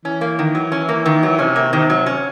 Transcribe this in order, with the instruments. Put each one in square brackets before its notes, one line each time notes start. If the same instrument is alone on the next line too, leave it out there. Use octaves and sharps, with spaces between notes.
[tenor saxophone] E3 [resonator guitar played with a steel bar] C#4
[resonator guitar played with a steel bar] A#3
D#3
F#3
C#4
A#3
D#3
F#3
[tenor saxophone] C3 [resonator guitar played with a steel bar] C#4
[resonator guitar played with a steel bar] A#3
[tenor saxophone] C3 [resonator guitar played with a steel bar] D#3
[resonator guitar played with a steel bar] F#3
C#4